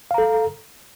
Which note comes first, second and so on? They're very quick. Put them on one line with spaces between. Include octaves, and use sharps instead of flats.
F5 A#5 A4